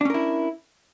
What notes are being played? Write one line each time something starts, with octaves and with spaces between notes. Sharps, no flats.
C#4 D4 E4 A#4